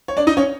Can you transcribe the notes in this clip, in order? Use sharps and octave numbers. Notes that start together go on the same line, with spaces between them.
C#5
D4 D5
D#4 D#5
C#4 C#5